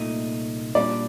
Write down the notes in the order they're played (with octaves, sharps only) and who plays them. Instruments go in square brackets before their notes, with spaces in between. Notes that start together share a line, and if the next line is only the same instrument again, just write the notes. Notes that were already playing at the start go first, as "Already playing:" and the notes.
Already playing: [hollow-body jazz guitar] C2 A#2 A3 D#4
[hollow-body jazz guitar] A#2 G3 D4 [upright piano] D5